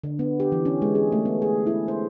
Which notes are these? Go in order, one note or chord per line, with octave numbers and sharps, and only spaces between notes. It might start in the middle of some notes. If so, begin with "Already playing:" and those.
D3
B3
G4
E3
C#4
G#3
G#4
A3
B3
G#4
E4
C5